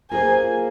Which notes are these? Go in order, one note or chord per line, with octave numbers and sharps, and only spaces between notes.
A#3 F4 G#4 C5 G#5